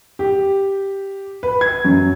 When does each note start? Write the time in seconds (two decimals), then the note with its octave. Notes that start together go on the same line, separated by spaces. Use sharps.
0.19 G4
1.43 B4
1.61 G#6
1.85 F#2